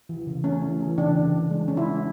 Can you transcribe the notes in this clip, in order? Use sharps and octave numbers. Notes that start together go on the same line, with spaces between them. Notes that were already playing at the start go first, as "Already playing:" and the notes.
E3
C#3
A3 C#4
E3
E3
C#3 D4
C#3
C#3
G#3
C#4
E4
G#3